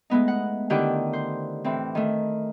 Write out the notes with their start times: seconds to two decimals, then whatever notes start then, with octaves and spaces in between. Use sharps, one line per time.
0.10 G#3 A3 B3 D#4
0.28 F#5
0.70 D3 D#3 E4 G4 F#5 D6
1.13 C5
1.64 A2 E3 C4
1.95 D#3 A3